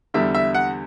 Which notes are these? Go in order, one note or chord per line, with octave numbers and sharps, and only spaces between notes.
E2 D3 G3 E5
E5
F#5